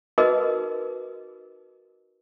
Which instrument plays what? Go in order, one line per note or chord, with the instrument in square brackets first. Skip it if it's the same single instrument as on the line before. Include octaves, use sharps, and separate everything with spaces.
[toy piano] D#4 F#4 G#4 A#4 B4 D#5